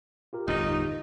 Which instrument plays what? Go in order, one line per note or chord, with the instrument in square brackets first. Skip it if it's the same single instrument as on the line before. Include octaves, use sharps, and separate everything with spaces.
[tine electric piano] F4 G4 A#4
[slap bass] G1 E2 A2 [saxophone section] D#4